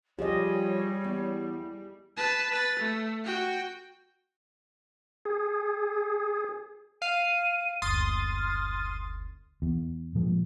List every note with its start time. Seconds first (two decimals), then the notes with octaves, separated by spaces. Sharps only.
0.19 F3 G3 G4 G#4 C#5 D#5
1.04 E2
2.17 B4 A5
2.50 B4 A6
2.79 A3
3.24 F#4 G5
5.25 G#4
7.02 F5 D#7
7.82 F#1 D2 C6 D#6 F6 A6
9.62 E2
10.15 A#2 F3 G#3